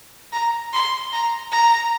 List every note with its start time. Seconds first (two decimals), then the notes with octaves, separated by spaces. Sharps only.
0.33 A#5
0.73 C6
1.12 A#5
1.52 A#5